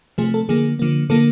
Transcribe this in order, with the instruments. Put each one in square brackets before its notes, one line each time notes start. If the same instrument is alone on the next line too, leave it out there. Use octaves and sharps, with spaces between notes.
[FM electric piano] C3 F3 A3 G#4
A4
D3 F3 A#3 G#4
D3 F3 A#3
D3 F3 A#3 A4